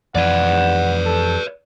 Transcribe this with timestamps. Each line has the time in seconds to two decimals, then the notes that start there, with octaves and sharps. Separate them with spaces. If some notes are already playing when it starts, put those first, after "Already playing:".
0.15 F2 E3 B4 D5 F#5
1.05 A4